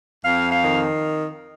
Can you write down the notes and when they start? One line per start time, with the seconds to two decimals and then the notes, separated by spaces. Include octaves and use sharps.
0.22 F2 F5
0.49 F5
0.63 D#3